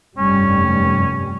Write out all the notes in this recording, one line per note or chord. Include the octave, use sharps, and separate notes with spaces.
F1 G2 G3 C#4